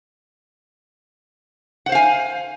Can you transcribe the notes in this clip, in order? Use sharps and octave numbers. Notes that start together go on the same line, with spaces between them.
C5 F5 F#5 G#5